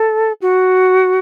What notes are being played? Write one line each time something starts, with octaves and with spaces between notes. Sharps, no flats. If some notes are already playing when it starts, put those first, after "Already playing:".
Already playing: A4
F#4